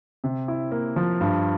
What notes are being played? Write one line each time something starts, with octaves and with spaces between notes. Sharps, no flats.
C3
E4
A#3
F3
G2